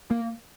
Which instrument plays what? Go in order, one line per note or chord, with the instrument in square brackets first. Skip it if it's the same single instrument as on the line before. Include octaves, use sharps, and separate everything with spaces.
[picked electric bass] A#3